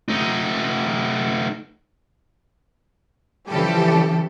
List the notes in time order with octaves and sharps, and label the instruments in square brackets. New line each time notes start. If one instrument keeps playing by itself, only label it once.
[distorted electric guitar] A3 D#4
[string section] C#3 E3 F3 G3 G4 A4